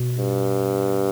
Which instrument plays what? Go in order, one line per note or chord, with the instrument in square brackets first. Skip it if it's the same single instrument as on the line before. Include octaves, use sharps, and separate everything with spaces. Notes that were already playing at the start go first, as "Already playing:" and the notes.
Already playing: [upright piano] B2
[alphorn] G2